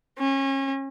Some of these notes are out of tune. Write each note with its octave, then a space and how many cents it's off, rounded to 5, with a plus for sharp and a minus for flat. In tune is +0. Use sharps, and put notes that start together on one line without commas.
C#4 -30